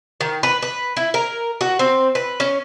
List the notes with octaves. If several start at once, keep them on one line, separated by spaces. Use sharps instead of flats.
D#3
B4
B4
E4
A#4
F#4
C4
B4
C#4